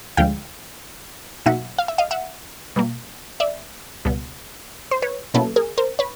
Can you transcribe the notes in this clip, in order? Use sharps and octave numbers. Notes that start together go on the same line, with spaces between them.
D2 D3 F3 G#3 F5 G5
B2 F#3 A#3 D#4 E5 F#5
F5
E5
D#5 F5
E5 F#5
B2 G3 A#3
D5 E5
C#2 B2 G3 B3
C5
B4 C#5
B2 F#3 A#3 C#4 E4 A4 B4
G#4 A#4
A#4 C5
B4 C#5